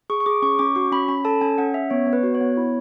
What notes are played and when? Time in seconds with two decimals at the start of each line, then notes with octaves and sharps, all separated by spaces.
0.10 G#4 C#6
0.20 C#6
0.26 G#4 D6
0.42 C#4 C#6
0.59 C#4 D6
0.75 F#4 C#6
0.92 C#4 B5
1.08 C#4 B5
1.25 A4 A5
1.41 C#4 G#5
1.58 C#4 F#5
1.74 C#4 E5
1.90 B3 C#5
2.07 B3
2.13 B4
2.23 F#4
2.35 C#5
2.41 B3
2.57 E4